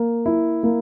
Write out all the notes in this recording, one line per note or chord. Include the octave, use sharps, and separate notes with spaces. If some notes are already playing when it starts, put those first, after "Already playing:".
Already playing: A#3
E4
A#3